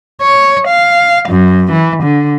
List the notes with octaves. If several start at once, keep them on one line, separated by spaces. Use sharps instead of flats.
C#5
F5
F#2
E3
D3